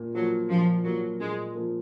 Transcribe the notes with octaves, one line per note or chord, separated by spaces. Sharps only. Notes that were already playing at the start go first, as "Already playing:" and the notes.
Already playing: A#2 A#3
F3 F#3 A#3
A#2 F3
F3 F#3 A#3
A#2 G#3
F3 A#3